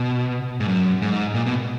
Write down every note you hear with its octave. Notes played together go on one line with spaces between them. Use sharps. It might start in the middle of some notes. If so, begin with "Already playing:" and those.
Already playing: B2
G#2
F#2
G#2
A#2
B2